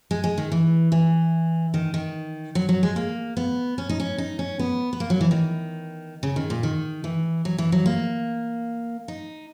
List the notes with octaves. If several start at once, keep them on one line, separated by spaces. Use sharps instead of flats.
G#3
G#3
D#3
E3
E3
D#3
D#3
F#3
F#3
G#3
A#3
B3
C#4
D#4
C#4
D#4
C#4
B3
B3
A#3
F#3
E3
D#3
C#3
D#3
A#2
D#3
E3
F#3
E3
F#3
A#3
D#4